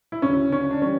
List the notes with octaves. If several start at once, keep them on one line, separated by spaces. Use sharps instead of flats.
E4
D2 C#3 F#3 C#4
C#4
D4
E3 G3 C#4